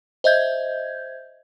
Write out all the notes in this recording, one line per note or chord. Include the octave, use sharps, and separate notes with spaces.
C5 D#5 E5 G6 G#6